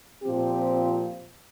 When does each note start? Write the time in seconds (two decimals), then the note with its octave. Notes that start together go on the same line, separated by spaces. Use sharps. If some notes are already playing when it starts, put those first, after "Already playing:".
0.23 A#2 F3 C4 G4